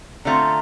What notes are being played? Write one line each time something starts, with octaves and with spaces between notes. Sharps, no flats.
D3 A3 C4 F4 A#5